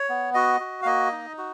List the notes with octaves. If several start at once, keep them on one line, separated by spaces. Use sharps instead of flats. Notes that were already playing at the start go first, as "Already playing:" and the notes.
Already playing: C#5
B3
F#4 D#5
F#4
F5
A#3 D#5
D#4
F#4